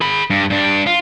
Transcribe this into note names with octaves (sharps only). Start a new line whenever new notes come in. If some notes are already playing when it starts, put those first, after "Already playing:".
G#4 B5
G2
G2 D4
F4